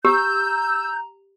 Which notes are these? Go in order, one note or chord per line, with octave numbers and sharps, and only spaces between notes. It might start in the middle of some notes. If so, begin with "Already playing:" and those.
G4 A#5 E6 G6